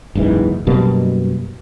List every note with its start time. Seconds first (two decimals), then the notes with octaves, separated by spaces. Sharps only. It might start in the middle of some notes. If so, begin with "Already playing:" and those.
0.15 F#1 C#2 G#2 E3
0.67 F#2 B2 G3 A#3